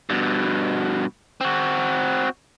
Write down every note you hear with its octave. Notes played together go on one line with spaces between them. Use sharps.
G2 B2
C4 F#4